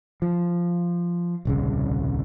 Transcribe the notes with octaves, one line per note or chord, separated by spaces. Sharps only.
F3
D#1 C2 C#3